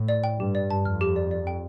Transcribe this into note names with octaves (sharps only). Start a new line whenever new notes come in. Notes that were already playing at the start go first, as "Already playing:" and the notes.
Already playing: A2
D5
G5
G2 G4
D5
A5
F2 F6
G4
D5
D5
G5